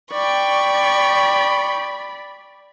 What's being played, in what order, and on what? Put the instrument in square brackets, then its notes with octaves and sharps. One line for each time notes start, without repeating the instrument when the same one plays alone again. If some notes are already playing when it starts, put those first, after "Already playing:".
[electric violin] D5 B5 [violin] G5 C#6